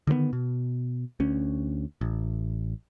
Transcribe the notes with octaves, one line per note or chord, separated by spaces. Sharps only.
D3 D#3 G3 B3
B2
D2 C#4
A1